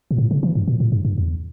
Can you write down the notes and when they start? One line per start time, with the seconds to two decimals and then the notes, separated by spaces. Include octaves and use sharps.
0.11 A#2
0.18 A2
0.31 C#3
0.43 E3
0.55 G2
0.68 A#2
0.80 A2
0.92 G2
1.05 G2
1.18 E2